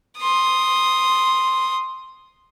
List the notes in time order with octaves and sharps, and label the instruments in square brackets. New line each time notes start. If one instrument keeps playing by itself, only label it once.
[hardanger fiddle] C6 D#6